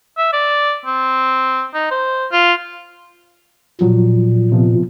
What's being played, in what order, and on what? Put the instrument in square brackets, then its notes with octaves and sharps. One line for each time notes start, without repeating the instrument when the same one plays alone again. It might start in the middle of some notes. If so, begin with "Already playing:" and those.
[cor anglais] E5
D5
C4
D#4
C5
F4
[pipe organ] A#2 [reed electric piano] F3 F#3
[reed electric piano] C3 F3 B3